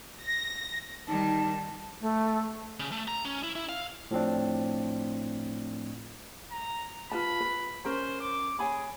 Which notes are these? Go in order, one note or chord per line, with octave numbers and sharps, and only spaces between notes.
A#6
D#3 G3 D#4 A5
A3
C#3
A3
A#5
C#4
E4
E4
F5
A2 F3 C4 D4
A#5
F4 B4 A5 B5
B4
C#4 A#4 C5 A#5
D6
G#4 C#5 G#5 B5